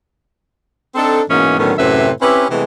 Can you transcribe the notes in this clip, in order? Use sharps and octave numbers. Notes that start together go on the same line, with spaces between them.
C4 D4 D#4 A4
G#2 B2 E3 G#3 A#3 C#4
A2 D3 D#3 F#3 B3 C#4
F#2 A2 C3 C4 B4 E5
C4 C#4 E4 G4 B4
C3 E3 G#3 A3 B3